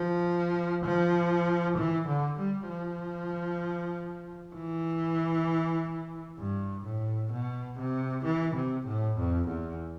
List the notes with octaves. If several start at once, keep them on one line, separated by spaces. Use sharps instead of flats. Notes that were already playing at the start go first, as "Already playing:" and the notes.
Already playing: F3
F3
E3
D3
G3
F3
E3
G2
A2
B2
C3
E3
C3
A2
F2
E2